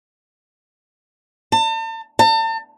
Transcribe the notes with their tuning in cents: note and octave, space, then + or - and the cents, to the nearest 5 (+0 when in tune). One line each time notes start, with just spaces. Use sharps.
A5 +40
A5 +40